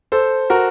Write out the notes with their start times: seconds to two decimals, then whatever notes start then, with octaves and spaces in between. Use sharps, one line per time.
0.12 A4 C5
0.50 F#4 A#4